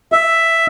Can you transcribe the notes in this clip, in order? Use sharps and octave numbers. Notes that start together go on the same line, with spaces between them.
E5